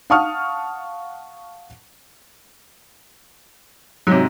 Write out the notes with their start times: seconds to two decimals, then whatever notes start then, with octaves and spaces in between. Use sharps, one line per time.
0.10 F5 F#5 A5 C#6 D#6 F6
4.07 G#2 C3 F#3